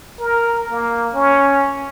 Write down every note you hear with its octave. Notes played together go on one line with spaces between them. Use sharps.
A#4
A#3
C#4